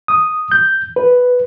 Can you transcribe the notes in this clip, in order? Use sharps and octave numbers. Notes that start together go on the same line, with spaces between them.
D#6
G6
B4